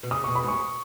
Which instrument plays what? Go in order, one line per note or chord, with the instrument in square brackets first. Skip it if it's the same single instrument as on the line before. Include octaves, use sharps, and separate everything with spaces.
[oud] B2
[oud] C#3 [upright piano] D#6
[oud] B2 [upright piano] C#6
[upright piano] B5
[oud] G#2
[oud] F#2 [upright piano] C#6